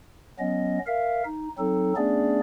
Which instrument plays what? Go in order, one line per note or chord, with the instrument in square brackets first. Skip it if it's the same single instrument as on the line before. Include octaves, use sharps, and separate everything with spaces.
[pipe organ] F#3 B3 C#4 D#5
A#4 E5 F5
D#4
F#3 C4 D#4 A4
A3 B3 C#4 D4 G#4 D5